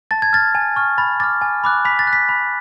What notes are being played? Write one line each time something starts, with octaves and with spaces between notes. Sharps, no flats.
A5 A6
G#6
F6 A6
G#5
C#6 F6
B5 A6
D6 F6 A6
G#5
B5 D6 F#6
B5 B6
A6
F#6
B6
B5